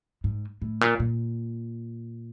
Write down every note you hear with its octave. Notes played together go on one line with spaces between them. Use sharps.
G#2
A2
A#2
A#2